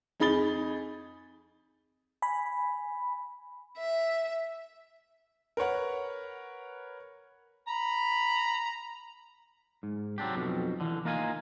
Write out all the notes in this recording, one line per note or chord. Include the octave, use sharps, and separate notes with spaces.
F2 D#4 G#4 B5 A6 G7
G#5 B5
E5
A#4 B4 C#5 F#5
A#5 B5
G#2
F#3 C4 D4 G4
B1 F2 B2
D3 E3
A#3 D#4 F4 F5 G5 G#5